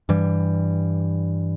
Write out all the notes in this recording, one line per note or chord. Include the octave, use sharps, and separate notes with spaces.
G2 E3 G3